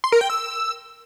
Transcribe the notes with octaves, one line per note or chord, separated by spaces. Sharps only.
C6
A#4
G5
E6